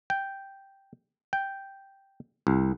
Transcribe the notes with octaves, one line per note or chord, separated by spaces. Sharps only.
G5
G5
C2